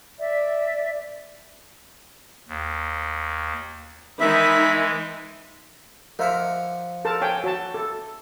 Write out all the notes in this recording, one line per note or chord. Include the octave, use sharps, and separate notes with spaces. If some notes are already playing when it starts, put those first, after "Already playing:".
D5 E5
D#2
D#3 E3 G#3 D#4 E5 B5
F3 A#4 D#5 E5 F#5 D6
A4 A#4 A5
C#5 G5 G#5
F#4 C#5 A5
A4